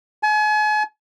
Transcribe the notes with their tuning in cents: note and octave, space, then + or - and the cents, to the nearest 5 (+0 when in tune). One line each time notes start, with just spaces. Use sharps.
G#5 +40